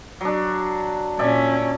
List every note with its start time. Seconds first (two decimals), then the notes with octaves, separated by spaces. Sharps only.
0.21 F#3 D4
1.19 A#2 C#4 D5 E5 G#5